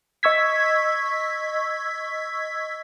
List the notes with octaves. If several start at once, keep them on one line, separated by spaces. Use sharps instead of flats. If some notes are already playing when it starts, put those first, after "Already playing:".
D#5 C#6 E6 G#6 B6